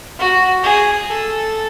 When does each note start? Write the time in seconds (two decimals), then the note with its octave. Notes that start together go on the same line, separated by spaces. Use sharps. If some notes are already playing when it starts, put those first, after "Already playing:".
0.19 F#4
0.63 G#4
1.09 A4